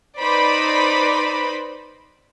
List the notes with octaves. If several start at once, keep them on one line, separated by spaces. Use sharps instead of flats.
D#4 B4 C5 D5 B5